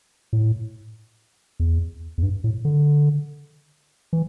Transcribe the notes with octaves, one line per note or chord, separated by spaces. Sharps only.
A2
E2
E2
G2
A2
D3
E3